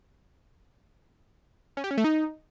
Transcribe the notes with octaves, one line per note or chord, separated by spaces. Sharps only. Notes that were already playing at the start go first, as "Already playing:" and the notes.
C#4
G4
C#4
A3
D#4